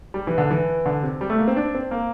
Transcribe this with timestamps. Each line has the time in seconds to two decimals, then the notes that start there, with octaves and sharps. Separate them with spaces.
0.14 G3
0.27 E3
0.38 D3
0.50 E3
0.86 D3
1.03 C3
1.21 G3
1.30 A3
1.38 A#3
1.48 C4
1.56 D4
1.75 C4
1.91 A#3